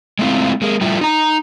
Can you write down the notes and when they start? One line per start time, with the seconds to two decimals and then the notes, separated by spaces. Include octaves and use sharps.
0.19 G#3 A3 C4 E4 F4
0.62 G#3 A#3
0.81 G3 A3 E4 F4
1.01 D#4 A#5